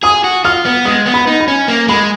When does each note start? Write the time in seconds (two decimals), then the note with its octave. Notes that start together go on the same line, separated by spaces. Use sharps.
0.03 G#4 D#6
0.24 F#4
0.44 F4 F6
0.65 B3
0.85 G#3 D#6
1.06 B3
1.14 B5
1.27 D#4
1.40 B5
1.48 C#4
1.68 A#3
1.88 G#3 B5